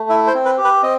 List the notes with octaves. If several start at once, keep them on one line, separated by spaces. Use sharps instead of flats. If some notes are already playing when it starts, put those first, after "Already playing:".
Already playing: A3
E4 E5
C5
C4
B4
G4
B4
C4 D#5